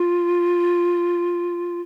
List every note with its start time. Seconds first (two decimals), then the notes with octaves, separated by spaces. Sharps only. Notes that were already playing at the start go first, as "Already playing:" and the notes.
Already playing: F4